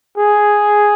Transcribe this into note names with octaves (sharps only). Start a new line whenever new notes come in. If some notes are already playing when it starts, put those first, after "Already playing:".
G#4